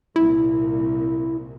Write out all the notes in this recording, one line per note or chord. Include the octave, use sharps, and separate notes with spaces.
C2 A#2 E4